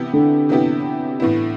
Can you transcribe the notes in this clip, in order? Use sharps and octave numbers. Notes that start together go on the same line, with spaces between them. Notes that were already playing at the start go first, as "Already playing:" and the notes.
Already playing: C3 E3 B3 E4 G4
D3
C3 E3 B3 E4 G4
A2 E3 B3 E4